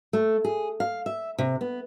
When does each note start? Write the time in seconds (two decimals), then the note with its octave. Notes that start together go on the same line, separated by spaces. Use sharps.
0.13 A3
0.45 G#4
0.80 F5
1.06 E5
1.38 C3
1.61 B3